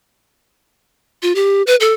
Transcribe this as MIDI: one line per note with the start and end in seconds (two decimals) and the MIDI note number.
1.22 1.33 65
1.35 1.62 67
1.67 1.76 71
1.80 1.93 69